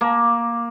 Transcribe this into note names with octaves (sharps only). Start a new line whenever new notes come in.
A#3